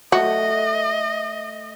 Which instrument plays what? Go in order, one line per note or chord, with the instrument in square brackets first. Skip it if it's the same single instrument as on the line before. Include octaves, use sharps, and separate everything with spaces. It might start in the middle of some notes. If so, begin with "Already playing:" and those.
[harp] A3 [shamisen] F#4 [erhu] D#5